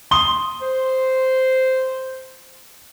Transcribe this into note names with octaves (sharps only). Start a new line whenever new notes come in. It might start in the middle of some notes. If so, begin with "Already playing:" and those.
C6 D#6 G7
C5